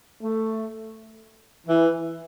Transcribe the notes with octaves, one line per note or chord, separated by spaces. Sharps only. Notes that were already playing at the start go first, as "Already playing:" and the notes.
A3
E3